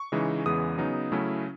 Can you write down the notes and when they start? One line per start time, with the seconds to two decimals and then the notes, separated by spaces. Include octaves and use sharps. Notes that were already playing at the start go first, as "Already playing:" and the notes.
Already playing: C#6
0.12 C#3 E3 G#3 D#4
0.46 E2 C#3 E3 G#3 B3 D#6
0.78 C#3 F#3 B3 D#4
1.12 C#3 F#3 A3 C#4 E4